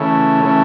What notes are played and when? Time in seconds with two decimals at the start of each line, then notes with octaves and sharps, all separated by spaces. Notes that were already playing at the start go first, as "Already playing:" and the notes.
Already playing: C#3 E3 A3
0.43 C#3 E3 A3